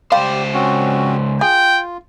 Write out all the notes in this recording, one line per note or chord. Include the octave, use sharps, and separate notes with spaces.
C#2 G3 G4 C5 F5
C4 C#4 F#4
F4 G#4 G5